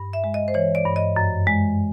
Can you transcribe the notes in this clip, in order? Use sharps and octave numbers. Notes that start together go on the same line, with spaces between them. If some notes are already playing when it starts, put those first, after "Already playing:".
Already playing: G2
E5
G#3
D#5
C5
E3 C#5
D5
G2
D#5
F#2
G#3